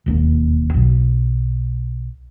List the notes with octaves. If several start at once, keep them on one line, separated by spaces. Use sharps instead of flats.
E1 D#2 E3 A#3
B1 B2